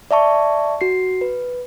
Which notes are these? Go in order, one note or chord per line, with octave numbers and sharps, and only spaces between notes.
D5 E5 A5 C#6
F#4 C7
B4